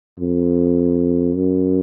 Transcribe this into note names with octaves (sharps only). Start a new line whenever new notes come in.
F2
F#2